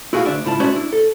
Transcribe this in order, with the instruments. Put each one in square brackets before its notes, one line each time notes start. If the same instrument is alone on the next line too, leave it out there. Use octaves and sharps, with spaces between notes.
[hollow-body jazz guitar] E4 F#4 G#4 E5 F5
D2 D4 D5 E5
C#2 G#2 E4 F4 A5
G#3 C#4 F#4 C5 D5 E5
D4 E4
A4